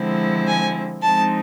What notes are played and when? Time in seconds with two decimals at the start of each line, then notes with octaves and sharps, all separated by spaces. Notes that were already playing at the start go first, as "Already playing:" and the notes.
Already playing: D3 F3 G#3 C4 E4
0.47 G#5
1.02 F3 G#3 C4 D#4 A5